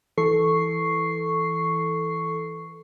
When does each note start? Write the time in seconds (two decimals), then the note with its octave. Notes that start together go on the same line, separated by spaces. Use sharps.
0.17 E3 A4 C#6 C7